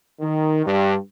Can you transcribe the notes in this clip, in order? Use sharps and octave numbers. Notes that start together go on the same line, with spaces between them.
D#3
G2